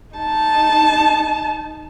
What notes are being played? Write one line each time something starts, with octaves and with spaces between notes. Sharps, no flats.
D#4 A5